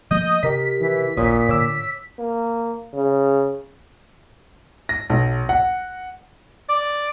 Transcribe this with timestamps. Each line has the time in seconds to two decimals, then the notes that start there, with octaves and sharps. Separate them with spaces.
0.11 F3 A3 A#3 D#5 G6
0.43 C3 G4 A#4 D#5 B6
0.81 E3
1.17 A1 D2 A#2 C#5 D#6
1.48 A2 D3 C#5 D6 E6
2.19 A#3
2.95 C#3
4.89 A#6
5.10 B1
5.49 F#5
6.70 D5